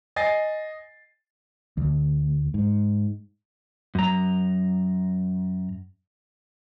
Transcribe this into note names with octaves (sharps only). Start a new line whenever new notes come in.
D#5 G#5 A6 C7
D2
G#2
F#2 A#5